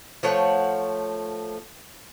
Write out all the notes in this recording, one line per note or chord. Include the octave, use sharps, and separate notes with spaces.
F3 A3 C#5 F#5